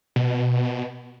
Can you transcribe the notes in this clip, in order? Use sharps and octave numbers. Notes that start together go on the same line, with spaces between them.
B2